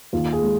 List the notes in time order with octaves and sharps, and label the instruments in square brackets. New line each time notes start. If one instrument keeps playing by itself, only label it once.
[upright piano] D#2 F4
G#4
G#3